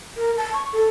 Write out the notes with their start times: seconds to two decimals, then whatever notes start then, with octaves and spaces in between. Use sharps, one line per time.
0.17 A#4
0.37 A5
0.53 C#6
0.73 A4